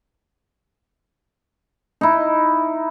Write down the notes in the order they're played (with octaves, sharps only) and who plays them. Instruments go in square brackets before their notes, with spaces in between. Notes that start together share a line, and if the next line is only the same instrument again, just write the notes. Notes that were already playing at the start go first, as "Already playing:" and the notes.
[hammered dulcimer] D#4 E4